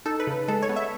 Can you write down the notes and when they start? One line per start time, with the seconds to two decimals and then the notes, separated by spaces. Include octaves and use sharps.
0.05 D#4 A4
0.20 B4
0.27 C#3
0.48 G#3 A4
0.62 C#5
0.69 B3
0.76 E5